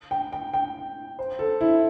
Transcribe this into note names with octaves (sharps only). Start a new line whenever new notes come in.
G5
G5
G5
C5
A4
E4